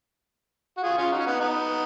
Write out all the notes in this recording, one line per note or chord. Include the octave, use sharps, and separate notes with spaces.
F#4
F4 G#4
C#4 F4
D#4 F#4
C#4
B3 D#4
B3 D#4